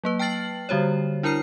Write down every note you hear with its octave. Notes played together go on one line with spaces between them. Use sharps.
F#3 A#3 B4
G5 A5 F6 A6 C7 F#7
D3 G3 F#4 C5 C#5
D4 E4 A#4 A#5 F6 C7